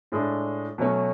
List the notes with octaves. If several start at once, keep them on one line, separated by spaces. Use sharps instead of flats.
A2 G#3 D4
B2 F#3 A3 C#4